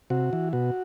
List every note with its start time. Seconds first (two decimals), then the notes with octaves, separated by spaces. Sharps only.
0.10 C3 F#4
0.33 E3
0.53 B2 F#4